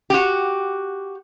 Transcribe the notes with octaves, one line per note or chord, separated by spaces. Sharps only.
F#4 G4